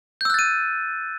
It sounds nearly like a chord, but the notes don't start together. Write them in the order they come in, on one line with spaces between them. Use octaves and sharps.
G6 E6 F#6 A6 D#7